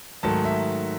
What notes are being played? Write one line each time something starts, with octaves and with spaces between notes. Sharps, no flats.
G#2 D#3 F#3 A3 A5
E5